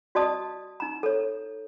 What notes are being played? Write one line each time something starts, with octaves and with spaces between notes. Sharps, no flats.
F#4 D5 D#5 A5 D#6
D#4 A#5
A4 C#5